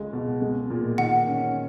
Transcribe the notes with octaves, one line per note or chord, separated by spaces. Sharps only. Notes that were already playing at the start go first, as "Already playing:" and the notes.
Already playing: C#2 G#3
B2
G#3
A#2
D#3 F#5
C#4